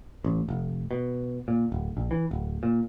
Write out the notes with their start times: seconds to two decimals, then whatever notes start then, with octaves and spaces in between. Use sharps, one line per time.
0.24 A1
0.49 F1
0.91 B2
1.48 A#2
1.72 D1
1.97 A#1
2.11 E3
2.31 D1
2.63 A#2